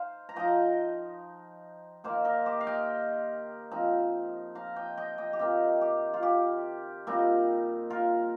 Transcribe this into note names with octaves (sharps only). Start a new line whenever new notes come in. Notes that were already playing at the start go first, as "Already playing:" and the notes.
Already playing: D#4 C5 F5
A#5
F3 D#4 D#5 G5
D#3 A#3 D#4 C5 F5
A#4 D#5
G4 C5
F5
D#5 G5
F3 C4 D#4
F5 A#5
D#5 G5
D#5 G5
D#5 G5
G4
D#3 C4 D#4 F4
G4
F4
G4
A#2 G3 C4 D#4
F4 A#4